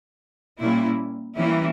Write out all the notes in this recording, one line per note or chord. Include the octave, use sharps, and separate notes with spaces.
A#2 G3 A#3 C#4 E4
E3 G3 A#3 C#4 E4